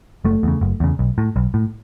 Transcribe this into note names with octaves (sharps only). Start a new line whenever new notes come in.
F#1 A3
E2 C#3
F#1
E2 C#3
B1
A2
B1
A2